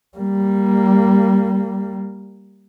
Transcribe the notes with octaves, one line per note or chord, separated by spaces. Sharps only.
G3 A#3